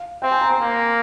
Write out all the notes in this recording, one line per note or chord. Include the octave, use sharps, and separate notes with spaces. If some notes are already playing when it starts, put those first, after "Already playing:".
Already playing: F5
C4 G5
G#5
A#5
C6
A#3